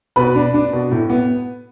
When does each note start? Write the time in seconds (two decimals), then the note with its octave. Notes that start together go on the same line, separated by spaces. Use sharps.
0.16 B2 B4 B5
0.36 D4
0.54 D4
0.73 B2
0.92 A2
1.10 B3